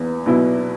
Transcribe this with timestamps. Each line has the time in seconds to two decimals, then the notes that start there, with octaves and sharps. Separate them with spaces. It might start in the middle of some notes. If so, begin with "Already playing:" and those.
Already playing: E2 B3
0.26 B2 F#3 B3 E4